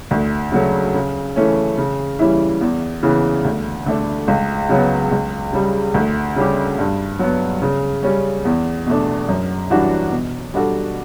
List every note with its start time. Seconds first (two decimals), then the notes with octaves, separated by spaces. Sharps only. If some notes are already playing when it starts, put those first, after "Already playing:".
0.11 D2
0.52 C#3 F#3 A3
0.94 C#3
1.36 E3 A3 C#4
1.78 C#3
2.19 E3 G3 C#4 E4
2.61 E2
3.03 C#3 E3 B3
3.45 D2
3.86 D3 A3 D4
4.28 C#2
4.69 C#3 F#3 B3
5.12 C#2
5.53 C#3 G3
5.94 D2
6.36 C#3 G3 C#4 G4
6.79 G2
7.19 F#3 B3
7.62 C#3
8.03 G3 C#4
8.45 E2
8.86 B2 A3 D4
9.28 F#2
9.70 E3 G3 D4 F#4
10.12 B2
10.54 G3 D4 F#4 A4